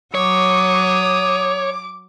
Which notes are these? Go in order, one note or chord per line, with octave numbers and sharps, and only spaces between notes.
F#3 C#5 D6 D#6